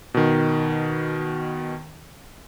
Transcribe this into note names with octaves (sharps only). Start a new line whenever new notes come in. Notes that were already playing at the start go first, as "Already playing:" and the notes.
B2 D#3